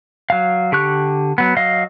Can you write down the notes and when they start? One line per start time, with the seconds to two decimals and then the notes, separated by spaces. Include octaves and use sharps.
0.30 F#3 F5
0.72 D3 G4 C#6 F#6
1.38 F#3 B3
1.57 F#3 D#5 F5